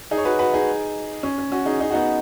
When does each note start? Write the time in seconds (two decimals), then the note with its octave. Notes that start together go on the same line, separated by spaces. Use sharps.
0.11 D#4 G#4
0.18 C#5
0.25 F#4 B4
0.39 F#4 B4
0.53 D#4 G#4
1.23 C#4
1.38 C#4
1.52 C#4 F#4
1.65 D#4 G#4
1.80 D#4 G#4
1.90 F#4
1.93 B3 D#4